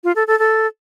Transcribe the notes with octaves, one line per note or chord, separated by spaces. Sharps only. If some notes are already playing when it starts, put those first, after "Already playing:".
F4
A4
A4
A4